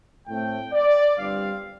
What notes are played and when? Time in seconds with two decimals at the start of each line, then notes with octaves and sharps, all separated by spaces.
0.27 A2 A3 C4 G5
0.73 D5
1.18 G1 G2 G3 C4 F5